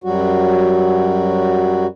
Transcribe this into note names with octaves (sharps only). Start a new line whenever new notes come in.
F#2 F#3 G3 F#4